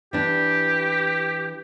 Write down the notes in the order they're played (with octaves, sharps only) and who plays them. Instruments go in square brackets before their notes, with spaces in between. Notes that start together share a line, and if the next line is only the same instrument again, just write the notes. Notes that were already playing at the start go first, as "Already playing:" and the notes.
[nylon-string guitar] E3 D4 [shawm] G4